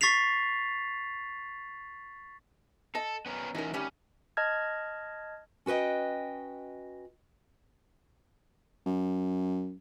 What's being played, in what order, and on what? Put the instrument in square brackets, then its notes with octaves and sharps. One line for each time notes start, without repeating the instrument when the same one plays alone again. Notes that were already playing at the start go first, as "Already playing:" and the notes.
[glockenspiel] C#6 A6 B6 C7 F7
[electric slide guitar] A4 [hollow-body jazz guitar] D#5 A5
[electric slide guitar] B3 C#4 A#4
[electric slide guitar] E3 F#3 C#4 [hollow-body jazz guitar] D#4 A#4
[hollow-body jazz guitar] D2 D#3 G3 [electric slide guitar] C#4
[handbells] D#5 A5 F6 G#6
[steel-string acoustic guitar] C#4 F#4 B4 D#5 G5
[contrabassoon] F#2